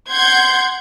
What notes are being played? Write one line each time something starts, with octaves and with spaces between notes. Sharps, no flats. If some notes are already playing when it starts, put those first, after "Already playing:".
F#5 C6 G6 G#6